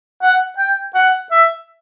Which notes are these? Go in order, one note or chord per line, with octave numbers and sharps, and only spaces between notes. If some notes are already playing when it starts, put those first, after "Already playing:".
F#5
G5
F#5
E5